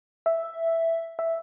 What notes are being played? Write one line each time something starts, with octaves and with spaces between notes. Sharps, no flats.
E5
E5